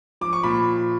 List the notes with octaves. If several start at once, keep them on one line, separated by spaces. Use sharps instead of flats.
F3 D6
C#6
A#2 B5